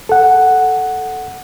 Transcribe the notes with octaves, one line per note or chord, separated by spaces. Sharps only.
A4 F#5